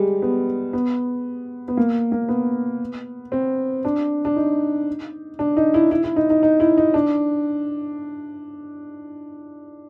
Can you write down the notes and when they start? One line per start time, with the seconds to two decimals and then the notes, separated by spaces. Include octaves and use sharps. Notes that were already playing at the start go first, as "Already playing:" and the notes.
Already playing: G3 G#3
0.22 B3
0.73 B3
1.68 B3
1.77 A#3
2.12 A#3
2.29 B3
3.32 C4
3.85 D4
4.25 D4
4.36 D#4
5.39 D4
5.57 D#4
5.74 E4
5.91 E4
6.04 E4
6.16 D#4
6.30 D#4
6.43 D#4
6.60 E4
6.77 D#4
6.94 D4